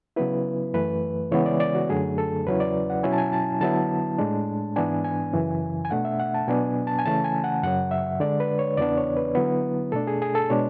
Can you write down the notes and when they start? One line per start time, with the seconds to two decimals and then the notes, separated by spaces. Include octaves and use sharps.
0.16 C#3 F#3 B3 E4 B4
0.74 F#2 E3 A3 B4
1.31 C#3 E3 G#3 B3 C#5
1.46 D5
1.60 D5
1.75 F#4
1.89 F#2 D3 F#3 A3 D4 G#4
2.18 A4
2.46 E2 C#3 F#3 C#4 E4 B4
2.60 D5
2.90 F#5
3.03 B2 F#3 C#4 E4 G#5
3.12 A5
3.18 G#5
3.33 A5
3.61 D3 F#3 B3 E4 A5
4.18 A2 G#3 D4
4.76 G#2 E3 B3 D4 G#5
5.04 G#5
5.33 F#2 C#3 E3
5.85 G#5
5.91 B2 A3 D4 F#5
6.05 E5
6.20 F#5
6.34 A5
6.48 B2 F#3 B3 D4 G#5
6.87 A5
6.99 G#5
7.05 C#3 E3 A3 C#4 A5
7.25 G#5
7.44 F#5
7.64 F#2 C#3 F#3 F#5
7.91 E5
8.20 D3 G#3 D4 D5
8.40 B4
8.59 C#5
8.77 E2 C#3 E3 B3 D4 D5
8.97 C#5
9.17 B4
9.35 D3 F#3 B3 E4
9.92 B2 A3 D4 A4
10.07 G#4
10.22 G#4
10.35 A4
10.50 B2 G#3 D4 C#5